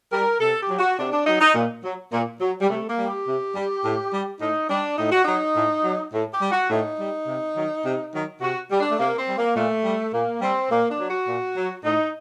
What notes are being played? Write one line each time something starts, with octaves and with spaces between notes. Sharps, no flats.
G3 A#4
C3 A4
G4
F#3
F#4
C3 D4
D4
F#3 D#4
D#4
A#2
F#3
A#2
F#3
G3
C3 A3
A#3
G3
G4
C3
G3
A2
G3
A2 D#4
G3 D4
A2 D#4
F#4
F#3 D#4
A2
F#3
A2
G4
G3
F#4
A2 D#4
G3
C3
D#3 F#3
C3
D#3 F#3
C3 F#4
G3
D4
A3
C3 A#3
C4
G3
A#3
A#2 A3
G3
A#2 A#3
G3 C4
A#2 A#3
D4
F#3
F#4
A#2
F#3
A2 D#4